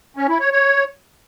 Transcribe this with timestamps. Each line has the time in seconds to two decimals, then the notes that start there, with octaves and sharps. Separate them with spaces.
0.17 C#4
0.28 E4
0.40 C#5
0.51 C#5